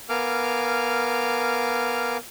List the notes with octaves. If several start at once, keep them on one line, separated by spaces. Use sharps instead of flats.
B3 A#4 F5 G#5 D6 F6